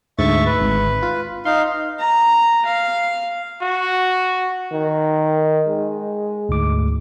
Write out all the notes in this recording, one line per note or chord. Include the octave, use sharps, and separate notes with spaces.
D2 G#2 E5 C#6 A6
B4
G#1
F4
D#4 F5 C6
A#5
F5
F#4
D#3
G#3
D2 G#2 D6